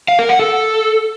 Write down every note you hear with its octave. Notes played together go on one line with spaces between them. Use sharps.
F5
A#4
F#5
A4